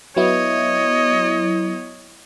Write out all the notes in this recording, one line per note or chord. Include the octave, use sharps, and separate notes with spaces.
F#3 B3 E4 C#5 D#5